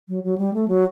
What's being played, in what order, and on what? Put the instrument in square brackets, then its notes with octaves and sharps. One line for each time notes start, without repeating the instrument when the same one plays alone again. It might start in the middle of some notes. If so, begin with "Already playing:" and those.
[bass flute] F#3
F#3
G3
A3
F#3